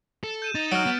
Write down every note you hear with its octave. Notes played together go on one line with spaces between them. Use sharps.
A4
G6 D#7 E7
D#4 A6 D#7
F#3 F6 D7
B3